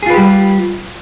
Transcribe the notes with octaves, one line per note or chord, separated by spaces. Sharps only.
G3 F4 G4 G#4 B4